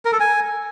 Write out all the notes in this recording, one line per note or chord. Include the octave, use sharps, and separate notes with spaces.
A#4
A4
G#5